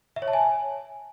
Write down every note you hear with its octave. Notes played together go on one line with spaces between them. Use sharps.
E5
C#5
A5
G#5